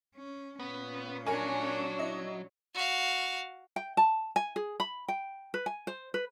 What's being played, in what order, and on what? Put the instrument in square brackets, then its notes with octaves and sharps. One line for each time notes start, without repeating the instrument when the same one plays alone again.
[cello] C#4
[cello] A#2 C#4 [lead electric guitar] B3
[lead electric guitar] F#3 [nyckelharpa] D4 C#5 [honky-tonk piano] A#4 G#5
[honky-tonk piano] E4 D#5
[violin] F#4 F5
[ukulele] G5
A5
G#5
G#4
B5
G5
B4
G#5
C5
B4